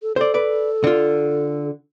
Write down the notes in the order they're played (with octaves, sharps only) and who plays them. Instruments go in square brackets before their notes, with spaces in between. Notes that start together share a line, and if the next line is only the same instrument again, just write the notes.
[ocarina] A4
[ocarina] A4 [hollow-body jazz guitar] C5 D5
[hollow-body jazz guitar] B4 D5
D3 F4